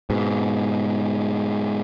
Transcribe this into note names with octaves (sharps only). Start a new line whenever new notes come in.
G#2 B2